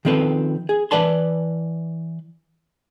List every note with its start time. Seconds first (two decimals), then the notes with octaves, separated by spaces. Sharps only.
0.05 D#3 F3 C4 A4 B4
0.69 G#4
0.91 E3 B4 D5 A5 C6